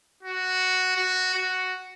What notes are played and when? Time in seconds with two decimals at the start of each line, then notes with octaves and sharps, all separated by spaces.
0.23 F#4
0.97 F#4
1.34 F#4